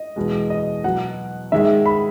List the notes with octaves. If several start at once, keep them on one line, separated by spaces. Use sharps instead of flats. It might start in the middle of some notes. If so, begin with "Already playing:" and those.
Already playing: D#5
E2 B2 G#3
D#5
B2 F#3 F#5
G#2 D#3 G#3 E5
B5